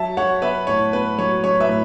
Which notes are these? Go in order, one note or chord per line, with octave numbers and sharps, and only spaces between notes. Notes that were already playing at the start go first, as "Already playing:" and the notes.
Already playing: F#3 E5 A5
F#3 C#5 F#5
B3 B4 E5
A2 C#5
B3 B4
F#3 C#5
F#3 C#5
B4 E5
A2